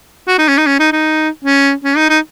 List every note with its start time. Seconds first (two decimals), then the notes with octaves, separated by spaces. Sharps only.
0.28 F#4
0.39 D#4
0.48 C#4
0.58 D#4
0.67 C#4
0.80 D#4
0.93 D#4
1.45 C#4
1.84 C#4
1.97 D#4
2.10 D#4